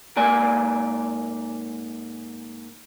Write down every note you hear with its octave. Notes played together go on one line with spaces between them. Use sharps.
G#2 A#3 D5 G#5